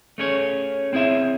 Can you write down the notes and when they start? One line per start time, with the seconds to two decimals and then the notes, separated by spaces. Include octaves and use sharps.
0.18 A3 C#4 G#4 C#5
0.93 C4 E4 G#4 C#5 E5